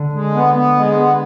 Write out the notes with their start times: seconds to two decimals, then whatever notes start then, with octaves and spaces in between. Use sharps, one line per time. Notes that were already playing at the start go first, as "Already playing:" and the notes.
Already playing: D3
0.12 G#3
0.34 B3
0.54 B3
0.76 G#3
0.97 B3